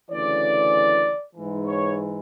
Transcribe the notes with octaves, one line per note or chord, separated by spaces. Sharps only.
D2 C#3 E3 D5
G#2 E3
C#5